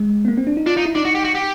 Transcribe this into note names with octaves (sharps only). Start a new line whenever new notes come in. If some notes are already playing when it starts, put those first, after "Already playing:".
Already playing: G#3
B3
A#3
C4
D4
D#4
D4 F4
D#4 F4
E4
D4 D#4
F#4
G4
F#4
G4